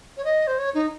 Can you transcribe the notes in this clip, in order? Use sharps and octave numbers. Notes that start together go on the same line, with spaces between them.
C#5
D#5
C5
C#5
D#4